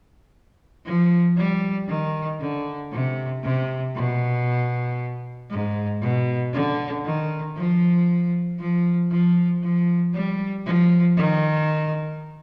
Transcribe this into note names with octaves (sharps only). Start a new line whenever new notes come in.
F3
G3
D#3
D3
C3
C3
B2
G#2
B2
D3
D#3
F3
F3
F3
F3
G3
F3
D#3